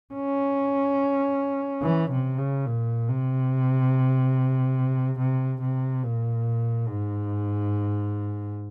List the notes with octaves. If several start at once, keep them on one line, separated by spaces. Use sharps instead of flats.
C#4
E3
C3
C#3
A#2
C3
C3
C3
A#2
G#2